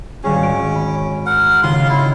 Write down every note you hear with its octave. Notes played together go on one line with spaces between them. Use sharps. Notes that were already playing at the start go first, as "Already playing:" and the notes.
D#1 G#1 C#4 G#4
D7
B5
A#4 F#5
D#2 C#3 F4 F5 C6
E4